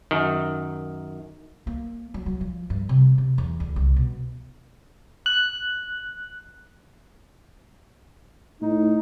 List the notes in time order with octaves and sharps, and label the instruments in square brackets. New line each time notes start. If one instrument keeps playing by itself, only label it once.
[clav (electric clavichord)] F#2 D#3
[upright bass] A#3
F#3
F#3
F3
G2
C3
C3
E2
D2
C2
B2
[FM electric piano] F#6
[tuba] A2 [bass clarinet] D#4